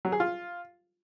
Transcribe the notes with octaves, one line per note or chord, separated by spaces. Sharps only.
F#3
G#4
F4